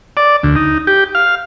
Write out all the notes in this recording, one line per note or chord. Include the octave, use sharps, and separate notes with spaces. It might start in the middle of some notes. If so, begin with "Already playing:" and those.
D5
D2
D#4
G4
F5